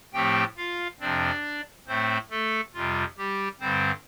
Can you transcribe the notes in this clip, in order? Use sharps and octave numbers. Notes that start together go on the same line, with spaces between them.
A2 F3 A3 C4 G4 G5
F4 F5
F2 C3 F3 C4 D4 D5
A2 A3 C4 C5
A3 A4
F2 C3 G3 F4
G3 G4
G2 D3 G3 C4 C5